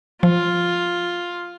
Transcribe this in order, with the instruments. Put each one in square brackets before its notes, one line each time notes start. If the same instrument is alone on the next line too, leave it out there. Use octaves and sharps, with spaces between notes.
[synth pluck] F3 [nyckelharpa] F4